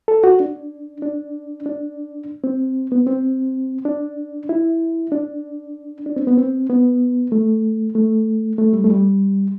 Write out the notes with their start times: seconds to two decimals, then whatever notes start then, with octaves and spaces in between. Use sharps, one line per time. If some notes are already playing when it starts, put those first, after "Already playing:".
0.08 A4
0.24 F#4
0.40 D4
1.02 D4
1.66 D4
2.44 C4
2.92 B3
3.07 C4
3.85 D4
4.49 E4
5.12 D4
6.06 D4
6.16 C4
6.27 B3
6.38 C4
6.70 B3
7.32 A3
7.95 A3
8.58 A3
8.73 G3
8.84 A3
8.90 G3